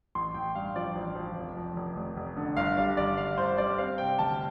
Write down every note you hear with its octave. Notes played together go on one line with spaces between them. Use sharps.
A1 C6
A1 G5
G2 F5
F3 D5
A1
F3
F1
F2
F1
F1
F1
D3
G1 F5
G3 F5
G1 D5
G1 F5
G1 C5
G3 D5
C4 F5
C3 G5
D2 A5